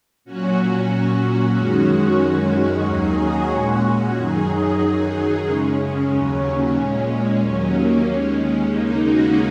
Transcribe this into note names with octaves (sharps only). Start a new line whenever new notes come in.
A#2 F#3 C#4 F#4
A#2 F#3
F#2 D#3 G#3 C#4 F#4
F#2 D#3 G#3
D#2 D#3 F#3 D#4 G#4
C#4 F#4
A#2 G#3
F#2 D#3 F#3 D#4 G#4
D#4 G#4
F#2 D#3 F#3
F#2 C#3 G#3 C#4
D#2 C#3 F#3
A#2 G#3 C#4
C#4
D#2 D#3 F#3 C#4
A#3
D#2 D#3 G#3 C#4
D#2 C#3 G#3 A#3 D#4
C#4 F#4